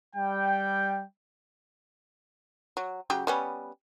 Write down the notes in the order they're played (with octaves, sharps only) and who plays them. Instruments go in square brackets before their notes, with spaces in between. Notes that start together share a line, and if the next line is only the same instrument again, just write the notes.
[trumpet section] G3 G5
[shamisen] F#3
C#3 F#3 G4
G3 B3 C#4